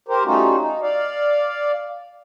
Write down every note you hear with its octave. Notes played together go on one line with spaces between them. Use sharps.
G4 A#4 C5
G3 A3 C#4 D#4 F4 F#4
D#4
D5 F5